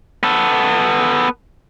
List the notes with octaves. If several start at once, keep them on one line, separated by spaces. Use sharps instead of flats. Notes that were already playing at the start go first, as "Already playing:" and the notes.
B3 A4